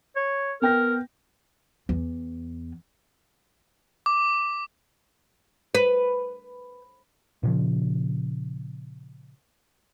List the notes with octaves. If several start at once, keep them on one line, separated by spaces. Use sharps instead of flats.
C#5
B3 A#4 G5 A#6
E2
D6
B4
A#2 C#3 F3